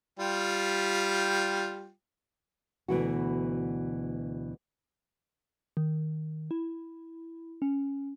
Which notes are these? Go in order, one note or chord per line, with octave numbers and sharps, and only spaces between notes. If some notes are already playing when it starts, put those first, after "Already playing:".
G3 F4 G5
D2 B2 E3 F#4
D#3
E4
C#4